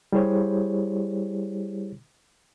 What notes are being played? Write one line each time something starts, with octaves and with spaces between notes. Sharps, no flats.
G3 E4 G4 G#4 C5 C#5